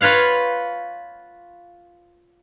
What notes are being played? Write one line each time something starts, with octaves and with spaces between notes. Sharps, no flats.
F4 B4 C#5 F5 F#5